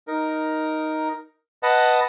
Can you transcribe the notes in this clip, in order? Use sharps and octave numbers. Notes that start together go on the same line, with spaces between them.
D#4 A#4
B4 D#5 F#5 A5